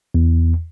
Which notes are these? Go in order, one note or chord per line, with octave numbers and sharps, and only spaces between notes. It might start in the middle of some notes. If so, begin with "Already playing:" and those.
E2